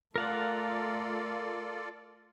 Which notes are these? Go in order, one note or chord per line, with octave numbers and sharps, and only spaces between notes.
A3 F4 A4 A#4 D5 F5 F#5